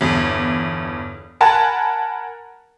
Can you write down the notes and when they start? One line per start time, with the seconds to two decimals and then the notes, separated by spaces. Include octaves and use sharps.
0.01 G1 E2
1.41 A#4 F#5 G#5 A5 B5